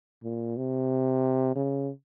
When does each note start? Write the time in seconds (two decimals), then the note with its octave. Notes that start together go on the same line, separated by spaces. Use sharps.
0.24 A#2
0.57 C3
1.56 C#3